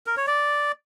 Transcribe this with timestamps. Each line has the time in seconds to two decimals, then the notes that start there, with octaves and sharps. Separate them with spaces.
0.07 A#4
0.17 C#5
0.27 D5